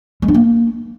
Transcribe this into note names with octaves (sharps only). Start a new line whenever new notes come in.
G#3
D4
A#3